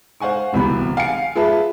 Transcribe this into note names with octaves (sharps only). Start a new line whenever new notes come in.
C5 F5 F#5 G#5 C#6
D1 C2 E3 B3 B5
F5 G#5 C#7
F4 G#4 B4 E5 A5